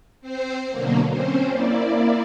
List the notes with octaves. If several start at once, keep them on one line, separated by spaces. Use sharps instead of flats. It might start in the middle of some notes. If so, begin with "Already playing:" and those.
C4 C5
B2 D3 F#3 A#3
C4 C#4 C5
A#3 E4 D5